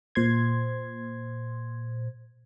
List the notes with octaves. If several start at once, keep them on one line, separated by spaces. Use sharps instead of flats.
A#2 C5 C6 G#6